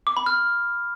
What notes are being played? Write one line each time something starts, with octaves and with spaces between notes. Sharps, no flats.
D6
B5
F6